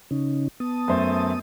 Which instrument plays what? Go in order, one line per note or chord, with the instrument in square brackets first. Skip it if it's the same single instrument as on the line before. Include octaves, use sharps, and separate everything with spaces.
[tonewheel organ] C#3 C#4 D#4
B3 A5 D#6
[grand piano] F#2 A3 C5